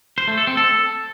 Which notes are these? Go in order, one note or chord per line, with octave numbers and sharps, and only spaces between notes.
C5
A3
A4
C4
A4